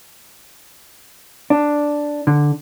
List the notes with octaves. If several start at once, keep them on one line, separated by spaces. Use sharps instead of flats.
D4
D3